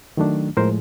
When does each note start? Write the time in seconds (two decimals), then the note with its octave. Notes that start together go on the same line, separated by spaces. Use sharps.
0.17 D#3 F#3 A3 D4
0.57 A2 F3 G#3 A#4 C5